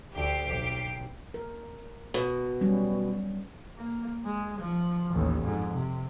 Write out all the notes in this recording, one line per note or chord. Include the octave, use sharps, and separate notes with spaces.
D2 G4 C7 D7
B1
A#4
B2
F#3 G3 C#4
A#3
G#3
F3
A1 D#2
F2 G#2
C3